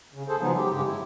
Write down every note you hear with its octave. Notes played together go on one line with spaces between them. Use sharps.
C#3
G#4 A4 C5
C#3 F3 F#3 G#3 B3 D#4
G4
G2 C#3 G#3 G4
E4